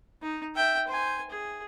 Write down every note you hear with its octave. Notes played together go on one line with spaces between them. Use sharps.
D#4
E5 G5
C5 G#5
G#4